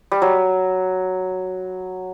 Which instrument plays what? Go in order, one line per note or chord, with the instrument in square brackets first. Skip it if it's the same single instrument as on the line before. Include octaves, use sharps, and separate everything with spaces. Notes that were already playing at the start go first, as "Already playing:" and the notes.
[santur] G3
F#3